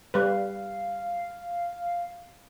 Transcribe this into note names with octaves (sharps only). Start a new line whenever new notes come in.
G3 B4 F5